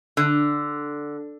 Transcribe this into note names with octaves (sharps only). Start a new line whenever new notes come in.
D3